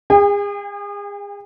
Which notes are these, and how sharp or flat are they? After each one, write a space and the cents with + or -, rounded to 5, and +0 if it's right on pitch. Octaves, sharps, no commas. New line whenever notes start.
G#4 -35 G5 +40